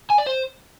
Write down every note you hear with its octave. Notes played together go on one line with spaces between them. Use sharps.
G#5
D5
C5